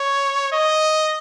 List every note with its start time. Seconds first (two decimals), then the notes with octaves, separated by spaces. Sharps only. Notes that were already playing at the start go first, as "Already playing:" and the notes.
Already playing: C#5
0.52 D#5